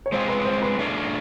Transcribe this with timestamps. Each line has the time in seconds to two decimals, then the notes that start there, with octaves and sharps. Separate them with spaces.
0.06 C#5
0.12 G#3 C4 F4 G#4 C5
0.28 B4
0.45 C5
0.62 B4
0.79 A3 D4 F4 G#4